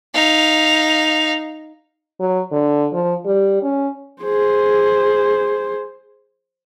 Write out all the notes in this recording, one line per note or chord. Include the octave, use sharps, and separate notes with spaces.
D#4 F5
F#3
D3
F3
G3
C#4
G#4 C5